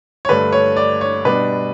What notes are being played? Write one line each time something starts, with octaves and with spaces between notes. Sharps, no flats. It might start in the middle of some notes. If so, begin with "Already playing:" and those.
C#5
G2 D3 A3 D4 B4
C#5
D5
C#5
B2 G3 D4 B4